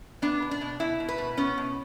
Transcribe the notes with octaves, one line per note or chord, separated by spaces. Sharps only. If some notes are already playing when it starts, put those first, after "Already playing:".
B3 D4
B2
D4
B2
B2 E4
B2
B4
B2
B3 C#4
B2